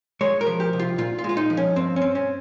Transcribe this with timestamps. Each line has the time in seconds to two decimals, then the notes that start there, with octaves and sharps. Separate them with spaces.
0.21 G#3 C#5
0.41 A#4
0.46 F3
0.60 G4
0.73 C2
0.79 F4
0.98 A#2 F4
1.19 F4
1.24 G#3
1.29 F4
1.37 D#4
1.50 F3
1.57 C#4
1.76 G2 C4
1.96 C#4
2.02 C4
2.15 C#4